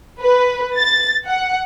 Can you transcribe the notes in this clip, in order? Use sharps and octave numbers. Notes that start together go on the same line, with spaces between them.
B4
A6
F#5